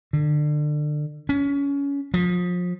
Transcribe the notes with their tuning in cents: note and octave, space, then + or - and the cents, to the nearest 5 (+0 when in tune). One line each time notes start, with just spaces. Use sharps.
D3 +25
C#4 +25
F3 +30